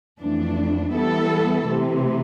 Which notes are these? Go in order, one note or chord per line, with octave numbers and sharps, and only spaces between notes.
F2 E3 A3 D4
E3 G3 B3 E4 A4
C3 E3 A3